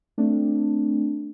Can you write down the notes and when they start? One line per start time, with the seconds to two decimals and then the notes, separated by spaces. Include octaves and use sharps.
0.18 A3 C4 D4